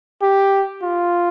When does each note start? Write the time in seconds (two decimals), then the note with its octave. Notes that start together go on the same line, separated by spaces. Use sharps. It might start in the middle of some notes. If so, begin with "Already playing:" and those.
0.22 G4
0.83 F4